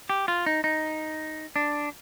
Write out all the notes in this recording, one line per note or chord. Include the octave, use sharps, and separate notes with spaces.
G4
F4
D#4
D#4
D4